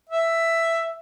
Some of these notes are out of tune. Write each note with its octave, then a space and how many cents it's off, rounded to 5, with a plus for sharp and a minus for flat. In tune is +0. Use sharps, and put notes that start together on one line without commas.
E5 +5